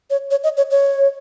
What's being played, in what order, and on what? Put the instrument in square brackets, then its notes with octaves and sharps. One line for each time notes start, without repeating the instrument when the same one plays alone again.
[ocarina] C#5
C#5
D#5
C#5
C#5